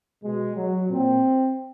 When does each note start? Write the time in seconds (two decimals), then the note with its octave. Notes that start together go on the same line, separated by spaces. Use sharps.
0.23 B2 G#3
0.55 F#3
0.89 A#2 C4